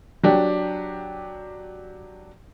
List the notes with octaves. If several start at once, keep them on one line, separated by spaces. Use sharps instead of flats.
F#3 D4 G4